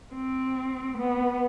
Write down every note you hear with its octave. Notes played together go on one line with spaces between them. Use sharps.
C4
B3